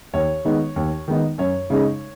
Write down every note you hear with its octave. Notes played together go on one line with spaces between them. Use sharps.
D#2 C#5
D#3 G#3 B3 D#4
D#2
D#3 G#3 B3 D#4
F#2 C#5
C#3 G#3 D#4